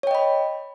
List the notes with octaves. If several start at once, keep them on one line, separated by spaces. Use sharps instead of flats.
C#5 D#5 G5 B5